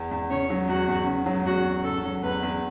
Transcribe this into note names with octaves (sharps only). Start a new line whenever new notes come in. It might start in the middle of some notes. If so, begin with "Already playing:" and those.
Already playing: E2
E2
C#3 C#5
F#3
E2 F#4
E2
C#3
F#3
E2 F#4
E2
C#3 A4
F#3
E2 B4
E2